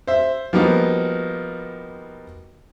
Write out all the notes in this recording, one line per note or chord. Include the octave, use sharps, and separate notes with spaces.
C5 E5
F3 G3 A#3 B3 D#4 F#4